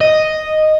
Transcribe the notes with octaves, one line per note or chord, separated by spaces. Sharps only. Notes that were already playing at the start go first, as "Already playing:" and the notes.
D#5